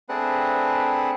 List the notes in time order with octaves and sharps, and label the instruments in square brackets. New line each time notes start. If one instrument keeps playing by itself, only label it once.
[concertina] A3 C4 D4 G#4 B4 F#5